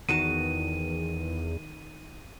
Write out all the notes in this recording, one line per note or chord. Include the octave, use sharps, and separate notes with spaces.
E2 D#3 F#4 A5 D#7